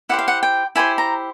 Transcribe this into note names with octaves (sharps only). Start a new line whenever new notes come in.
E4 G4 C5 F#5
F5
F#5
G5
E4 G4 C5 G#5
A#5